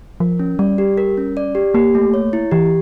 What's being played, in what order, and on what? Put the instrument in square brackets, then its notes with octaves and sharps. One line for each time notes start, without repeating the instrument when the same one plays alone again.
[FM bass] F3 [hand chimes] A#4
[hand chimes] C#4
[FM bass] G3 [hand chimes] D5
[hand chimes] G4
A#4
C#4
D5
G4
[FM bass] A#3 [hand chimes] G4
[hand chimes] A3
C#5
E4
[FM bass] E3 [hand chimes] G4